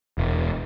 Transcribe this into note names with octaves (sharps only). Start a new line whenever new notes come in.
E1